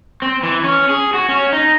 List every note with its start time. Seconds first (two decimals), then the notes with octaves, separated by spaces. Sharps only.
0.22 C4
0.43 E3
0.64 C#4
0.89 G#4
1.14 F#4
1.29 C#4
1.53 D#4